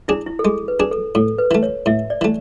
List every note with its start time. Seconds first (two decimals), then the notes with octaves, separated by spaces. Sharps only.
0.08 D4 E4 G#4
0.26 E4
0.39 A4
0.44 G#3 G#4
0.68 B4
0.80 D4 G#4
0.91 A4
1.15 A2 A4
1.38 B4
1.51 E3 A3
1.63 C#5
1.86 A2 E5
2.10 D5
2.21 E3 A3